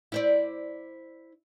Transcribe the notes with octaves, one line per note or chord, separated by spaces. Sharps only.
E4 C5 D5